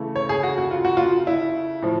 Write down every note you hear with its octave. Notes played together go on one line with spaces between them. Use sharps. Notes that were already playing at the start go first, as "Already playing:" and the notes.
Already playing: C#3 E3 A3
C#5
G#4
F#4
F#4
F4
F#4
F4
E4
A2 F3